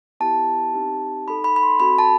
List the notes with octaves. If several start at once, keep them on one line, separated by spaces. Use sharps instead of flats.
B3 E4 G4 A5
C4 D#4 G4
D#4 A4 B5
B5
B5
C6
C4 F#4 A4 B5
A5